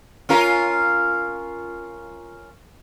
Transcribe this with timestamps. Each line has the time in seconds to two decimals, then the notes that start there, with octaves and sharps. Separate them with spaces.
0.29 C#4 F4 A#4